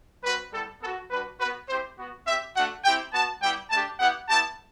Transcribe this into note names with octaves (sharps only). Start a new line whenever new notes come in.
G3 C4 F#4 B4
G3 B3 E4 A4
B3 F#4 A4
G3 D4 F#4 B4
B3 F#4 B4
C4 E4 G4 C5
B3 F#4
C4 G4 E5
A3 D4 F#4 F#5
C4 E4 G4 G5
B3 F#4 A5
G3 B3 E4 G4 G5
A3 D4 G4 A5
B3 E4 G4 F#5
B3 E4 G4 A5